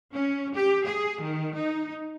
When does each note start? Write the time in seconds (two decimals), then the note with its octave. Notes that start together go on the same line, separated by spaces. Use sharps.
0.13 C#4
0.53 G4
0.85 G#4
1.21 D#3
1.56 D#4